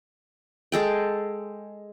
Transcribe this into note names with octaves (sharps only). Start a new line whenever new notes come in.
G#3 A4 G5